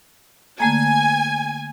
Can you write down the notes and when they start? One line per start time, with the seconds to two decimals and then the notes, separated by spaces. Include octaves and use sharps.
0.60 D3 A3 A#3 G#5